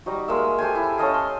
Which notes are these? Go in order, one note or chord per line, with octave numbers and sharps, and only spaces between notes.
G3 D#4 F#4
G#3 A#3 E5
G4 A4 C5 G#5
E4
C#4 A4 D#5 F5
C6